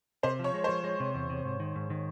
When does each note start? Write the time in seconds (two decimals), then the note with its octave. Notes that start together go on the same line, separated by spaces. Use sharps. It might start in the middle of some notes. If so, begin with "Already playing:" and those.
0.23 C3 C5
0.39 F3 C#5
0.54 G#3
0.64 F3 C5
0.84 G#3
1.00 C3
1.15 E2
1.30 C3
1.45 G#2
1.60 D#3
1.76 G#2
1.90 D#3